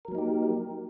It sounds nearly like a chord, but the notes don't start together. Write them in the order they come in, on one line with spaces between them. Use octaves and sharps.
A#4 F#3 A#3 D#4 G4